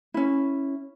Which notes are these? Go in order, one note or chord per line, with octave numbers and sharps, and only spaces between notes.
C#4 E4